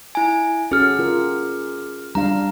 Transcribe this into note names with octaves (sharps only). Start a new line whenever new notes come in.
E4 G#5
C#4 F#4 G#4 A4 F6
F4 A#4
G3 D4 F5 A#5